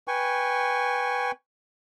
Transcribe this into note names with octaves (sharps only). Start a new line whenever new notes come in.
B4 G5 G#5 C#6